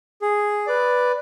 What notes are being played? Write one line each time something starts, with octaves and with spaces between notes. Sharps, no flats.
G#4
B4 D5